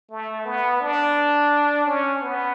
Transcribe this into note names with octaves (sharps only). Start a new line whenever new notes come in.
A3
B3
D4
C#4
B3